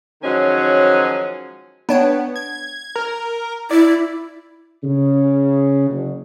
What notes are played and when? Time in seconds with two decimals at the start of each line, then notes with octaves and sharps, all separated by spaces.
0.22 D#3 F3 F#3 G#3 C#4
1.89 B3 D4 C#5 G5
2.36 G#6
2.96 A#4
3.71 E4 D5
4.84 C#3
5.89 F#1